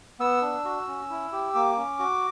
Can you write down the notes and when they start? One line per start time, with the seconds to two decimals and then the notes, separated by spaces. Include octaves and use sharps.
0.20 B3 E6
0.42 D4
0.65 F#4
0.87 C#4
1.10 E4
1.32 G4
1.55 A#3 D6
1.77 C#4
1.99 F#4